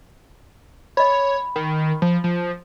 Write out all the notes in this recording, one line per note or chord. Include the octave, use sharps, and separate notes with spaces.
C#5 D#5 B5
D#3
F3
F3